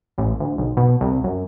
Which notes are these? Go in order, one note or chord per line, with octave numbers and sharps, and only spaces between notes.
A1
D2
B1
B2
C2
F#2